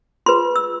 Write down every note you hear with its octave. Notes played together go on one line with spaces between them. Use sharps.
F4 G#4 B4 C6
E6